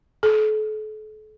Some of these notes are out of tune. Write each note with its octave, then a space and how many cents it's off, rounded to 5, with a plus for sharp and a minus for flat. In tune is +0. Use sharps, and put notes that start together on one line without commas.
A4 -40